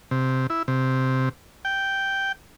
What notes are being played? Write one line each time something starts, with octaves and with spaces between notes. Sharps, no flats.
C3
E4
C3
G5